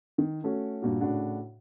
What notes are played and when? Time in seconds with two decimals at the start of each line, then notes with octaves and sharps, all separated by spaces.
0.18 D#3
0.44 A3 C#4 F#4
0.82 G2 A#2 F#4
1.01 A2 C#3 D4 F#4 F#5